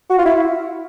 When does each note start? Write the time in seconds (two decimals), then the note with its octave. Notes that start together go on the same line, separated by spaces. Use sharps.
0.10 F#4
0.18 F4
0.26 E4